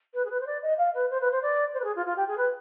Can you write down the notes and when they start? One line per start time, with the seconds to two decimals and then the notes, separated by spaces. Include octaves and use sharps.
0.14 B4
0.25 G#4
0.30 B4
0.40 C5
0.46 D5
0.62 D#5
0.78 F5
0.94 B4
1.10 C5
1.21 B4
1.31 C5
1.42 D5
1.74 C5
1.79 B4
1.84 G#4
1.95 F4
2.06 F4
2.16 G4
2.27 G#4
2.37 B4